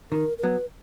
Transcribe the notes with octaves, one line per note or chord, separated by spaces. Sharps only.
D#3 A#4
A#4
F#3 B3 B4